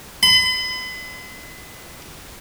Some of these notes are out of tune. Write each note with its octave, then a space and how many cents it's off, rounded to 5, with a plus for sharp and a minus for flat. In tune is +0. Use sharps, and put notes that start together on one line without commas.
B5 +45